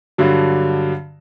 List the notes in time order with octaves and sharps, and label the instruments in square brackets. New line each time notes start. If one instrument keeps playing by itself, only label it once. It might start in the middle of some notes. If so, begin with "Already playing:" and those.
[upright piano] G2 D3 F#3